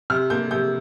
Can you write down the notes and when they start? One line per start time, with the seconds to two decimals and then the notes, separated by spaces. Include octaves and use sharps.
0.10 C3 F6
0.30 A#3 G6
0.51 C3 G6